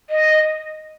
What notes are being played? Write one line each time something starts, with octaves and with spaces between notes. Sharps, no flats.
D#5